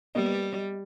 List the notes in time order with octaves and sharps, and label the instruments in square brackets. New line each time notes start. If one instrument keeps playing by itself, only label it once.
[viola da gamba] G3 [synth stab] A#3 B3 D#5